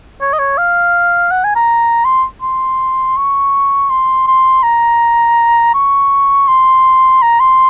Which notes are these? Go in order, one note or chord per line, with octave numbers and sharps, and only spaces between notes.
C#5
D#5
C#5
F5
F#5
G#5
A#5
C6
C6
C#6
C6
C6
A#5
C#6
C6
A#5
C6